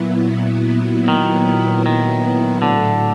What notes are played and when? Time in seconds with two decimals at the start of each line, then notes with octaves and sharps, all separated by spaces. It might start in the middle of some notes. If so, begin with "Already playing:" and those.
Already playing: A#2 F#3 B3 E4
1.08 D#3
1.86 D#3
2.62 A2 D3 F#3 A3